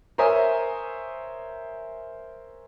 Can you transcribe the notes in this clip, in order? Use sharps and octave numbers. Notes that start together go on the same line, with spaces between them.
A#4 C5 C#5 E5 G#5 D#6